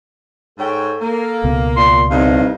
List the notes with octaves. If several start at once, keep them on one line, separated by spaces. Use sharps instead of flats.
G#2 A4 C#5 G5
A#3
C#2 B2 B3
A#2 C6
C2 G2 D#4 F5